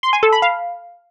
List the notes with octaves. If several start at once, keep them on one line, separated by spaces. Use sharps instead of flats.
C6
G#5
A4
B5
F5